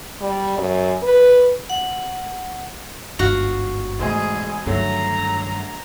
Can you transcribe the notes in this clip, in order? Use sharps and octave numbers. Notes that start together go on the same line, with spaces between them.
G3
F#2
B4
F#5
G1 G#2 F#4 F5
E1 G#2 A3 G#4 C5 D#5
G2 D3 D#3 F#3 A3 A#5